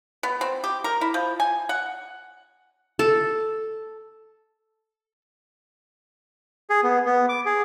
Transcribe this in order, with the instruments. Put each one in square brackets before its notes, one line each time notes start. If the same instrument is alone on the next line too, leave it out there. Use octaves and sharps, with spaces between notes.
[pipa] B3
C4
G4
A#4
E4
F3
G#5
F#5
[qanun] A4
[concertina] G#4
B3
B3
D6
G#4